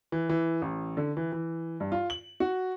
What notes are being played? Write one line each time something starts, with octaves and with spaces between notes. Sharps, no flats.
E3
E3
A1
D3
E3
E3
G2
F4
F#7
F#4